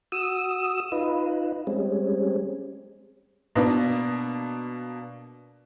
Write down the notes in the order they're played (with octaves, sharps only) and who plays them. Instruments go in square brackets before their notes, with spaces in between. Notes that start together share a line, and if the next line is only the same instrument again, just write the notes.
[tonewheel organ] F#4 D#6 E6
D#4 F4 B4
G3 G#3 C4 C#4
[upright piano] B2 A#3 B3 D4